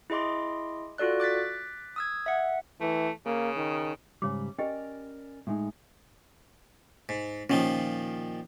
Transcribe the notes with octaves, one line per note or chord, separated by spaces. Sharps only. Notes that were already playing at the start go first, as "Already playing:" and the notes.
E4 G#4 D#5 C6 D6
F4 F#4 A4 D5 F#6
D6 F#6 A6 B6
D#6 E6 G#6
E5 F#5
E3 A3
C#3 A#3
D#3
G#2 C#3 G3 C#5 D6
C#4 G4 A#4 D5 D#5 G5
A2 G#3 D#4
G#2
A#2 D#3 F3 C#4